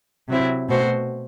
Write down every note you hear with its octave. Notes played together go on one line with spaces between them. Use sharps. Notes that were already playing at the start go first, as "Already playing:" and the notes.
C3 F#3 C4 E4
B2 A3 C4 F#4 C5